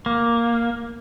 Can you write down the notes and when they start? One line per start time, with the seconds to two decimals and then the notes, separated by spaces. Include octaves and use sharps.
0.06 A#3